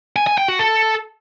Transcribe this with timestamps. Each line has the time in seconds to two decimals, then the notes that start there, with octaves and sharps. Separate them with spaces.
0.16 G#5
0.27 G#5
0.38 G5
0.48 F#4
0.59 A4